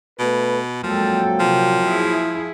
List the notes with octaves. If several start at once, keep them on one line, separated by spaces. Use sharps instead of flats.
B2 A3 B4
A#2 F3 F#3 G#3 A#3 C4 A4 G5
C3 F3
E4 G#4